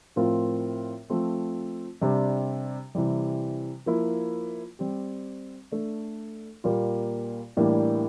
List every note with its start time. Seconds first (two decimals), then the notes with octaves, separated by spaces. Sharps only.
0.16 A2 F3 C4 F4 A#4
1.10 F3 A3 C4
2.01 C3 G3 D4
2.95 C3 E3 G3
3.86 F3 A#3 E4
4.79 G3 C4 G4
5.72 A3 D4 A4
6.64 A#2 G3 A#3 F4
7.57 A2 E3 G3 A#3 D4